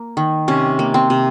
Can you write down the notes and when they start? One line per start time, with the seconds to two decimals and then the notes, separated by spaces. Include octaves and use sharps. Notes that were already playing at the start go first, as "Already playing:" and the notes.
Already playing: A#3
0.17 D#3
0.48 C3 C#4
0.79 A#3
0.94 C4
1.10 C3